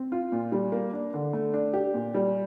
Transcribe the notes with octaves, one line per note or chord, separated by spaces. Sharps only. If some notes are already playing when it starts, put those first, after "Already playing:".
Already playing: C4
F4
A#2
G3
A#3
D4
D3
A3
D4
G4
A#2
G3